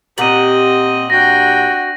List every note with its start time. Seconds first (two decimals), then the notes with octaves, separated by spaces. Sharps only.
0.18 A#2 C4 G4 D#5 F#5 D#7 F#7
1.10 D4 F#4 G5 A#6